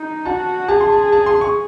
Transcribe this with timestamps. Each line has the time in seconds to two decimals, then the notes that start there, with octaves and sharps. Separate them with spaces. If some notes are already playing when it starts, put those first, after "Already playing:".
Already playing: D#4
0.25 F#4 A5
0.68 G#4 A5
0.81 C6
0.92 A5
1.12 A5
1.26 C6
1.41 C#6